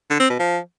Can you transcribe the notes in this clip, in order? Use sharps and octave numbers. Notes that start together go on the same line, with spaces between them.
D3
C4
B2
F3